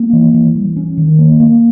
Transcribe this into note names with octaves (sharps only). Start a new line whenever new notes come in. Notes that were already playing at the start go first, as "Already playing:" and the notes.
Already playing: A#3
E3
E3
G3
C#4
D#3
A#3
A#3